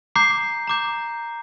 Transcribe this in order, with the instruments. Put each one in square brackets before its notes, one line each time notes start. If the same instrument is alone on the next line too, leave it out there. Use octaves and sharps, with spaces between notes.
[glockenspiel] A#5 D6 G6 C7
A#5 D6 G6